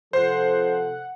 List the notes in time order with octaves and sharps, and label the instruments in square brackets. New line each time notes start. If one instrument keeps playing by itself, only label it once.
[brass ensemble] C3 F3 A4 [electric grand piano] C5 [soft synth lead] F#5